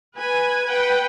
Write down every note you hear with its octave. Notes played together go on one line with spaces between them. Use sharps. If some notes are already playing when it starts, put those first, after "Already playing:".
B4 G#5
B4 F#5 G5